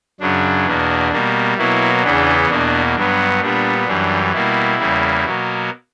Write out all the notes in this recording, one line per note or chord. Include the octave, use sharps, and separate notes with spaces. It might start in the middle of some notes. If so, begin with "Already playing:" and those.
F#2 C#3 F#3 D4
E2 B2 A#3
B2 G3 A#3
B2 F#3 A#3 E4
E2 C#3 E3 B3 D4
E2 B2 A#3 D4
G2 F#3 B3 D4
A#2 G3 B3 D4
F#2 E3 G3 D4
B2 G3 A#3 E4
E2 C#3 G3 A#3
B2 F#3 A#3